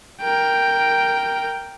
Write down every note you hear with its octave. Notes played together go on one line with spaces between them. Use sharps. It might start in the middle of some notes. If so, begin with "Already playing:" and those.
A#4 G5